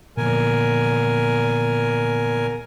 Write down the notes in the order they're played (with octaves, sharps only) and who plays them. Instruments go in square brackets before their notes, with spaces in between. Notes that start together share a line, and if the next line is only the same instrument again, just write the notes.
[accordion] E2 A#4 G#5 [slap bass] A#2 D3 F3